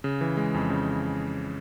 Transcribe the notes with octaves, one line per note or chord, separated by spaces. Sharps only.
C#3
E3
G#3
F2
C#3